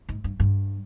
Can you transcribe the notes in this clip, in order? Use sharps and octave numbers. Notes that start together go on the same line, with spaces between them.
G#2
G2
G2